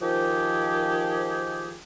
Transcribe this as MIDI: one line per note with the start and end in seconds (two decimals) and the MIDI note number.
0.02 1.73 51
0.02 1.73 53
0.02 1.73 67
0.02 1.73 68